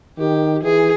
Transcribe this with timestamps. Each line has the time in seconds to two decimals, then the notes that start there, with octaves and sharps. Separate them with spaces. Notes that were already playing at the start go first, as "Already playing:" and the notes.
0.19 D#3 G4
0.63 E3 G#4